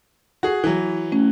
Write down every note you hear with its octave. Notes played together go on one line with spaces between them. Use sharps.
F#4 G#4
E3 F#3
A3 C#4